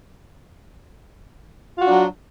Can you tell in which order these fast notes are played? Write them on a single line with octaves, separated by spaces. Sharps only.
F4 F#4 D4 F#3